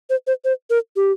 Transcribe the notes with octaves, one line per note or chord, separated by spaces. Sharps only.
C5
C5
C5
A#4
G4